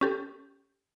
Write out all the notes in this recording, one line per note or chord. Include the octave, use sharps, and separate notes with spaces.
C#4 G4 A4